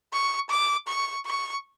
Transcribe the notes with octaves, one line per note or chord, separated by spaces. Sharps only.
C#6
D6
C#6
C#6